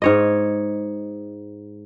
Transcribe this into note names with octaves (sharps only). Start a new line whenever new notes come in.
G#2 C#5 D#5